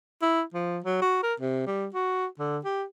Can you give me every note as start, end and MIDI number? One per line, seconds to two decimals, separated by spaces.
0.22 0.42 64
0.54 0.79 53
0.84 0.97 54
1.02 1.20 66
1.23 1.34 70
1.40 1.65 48
1.67 1.87 55
1.94 2.26 66
2.39 2.58 50
2.64 2.84 67